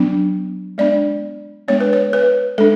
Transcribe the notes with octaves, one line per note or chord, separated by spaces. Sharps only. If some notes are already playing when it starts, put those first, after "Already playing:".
Already playing: F#3 B3 D4
G#3 B3 D4 D5
G#3 B3 D4 C#5
B4
C#5
B4
G#3 D4 A4